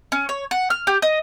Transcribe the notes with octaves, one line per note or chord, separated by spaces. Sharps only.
C#4
C#5
F#5
F6
G4
D#5